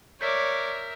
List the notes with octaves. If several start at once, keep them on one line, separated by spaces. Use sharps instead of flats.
A#4 C#5 D5 E5 D6 G6 B6